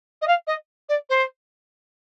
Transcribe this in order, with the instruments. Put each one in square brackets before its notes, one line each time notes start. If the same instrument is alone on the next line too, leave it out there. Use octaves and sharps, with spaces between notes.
[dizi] D#5
F5
D#5
D5
C5